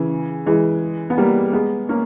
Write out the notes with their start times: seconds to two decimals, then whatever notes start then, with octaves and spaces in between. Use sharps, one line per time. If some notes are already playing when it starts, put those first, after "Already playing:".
Already playing: C#3 E3
0.46 E3 G#3
1.10 B3
1.18 G3 A#3
1.53 G#3 B3
1.89 A#3 C#4